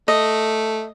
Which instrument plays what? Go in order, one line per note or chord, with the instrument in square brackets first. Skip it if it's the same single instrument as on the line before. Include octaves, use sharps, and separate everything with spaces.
[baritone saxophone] A3 [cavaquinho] D#5